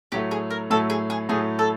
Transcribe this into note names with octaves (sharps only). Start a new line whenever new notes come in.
A2 F#3 A3 G4
G#4
A#4
A2 F#3 A3 A4
G#4
G#4
A2 F#3 A3 G#4
A4